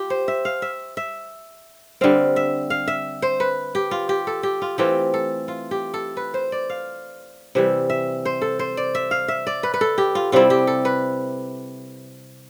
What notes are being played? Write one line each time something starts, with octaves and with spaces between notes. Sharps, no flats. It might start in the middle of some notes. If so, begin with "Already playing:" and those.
Already playing: F4 G4
C5
E5
F5
E5
E5
D3 G3 C4 F5
E5
F5
E5
C5
B4
G4
F4
G4
A4
G4
F4
E3 A3 C4 F4 G4
A4
F4
G4
A4
B4
C5
D5
F5
C3 E3 G3 E5
E5
C5
A4
C5
D5
E5
F5
E5
D5
B4
B4
A4
G4
F4
C3 G3 C4 E4 F4
G4
A4
B4